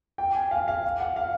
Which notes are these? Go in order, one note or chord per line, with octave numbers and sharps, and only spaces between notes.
G5
G#5
F5
F5
F#5
F5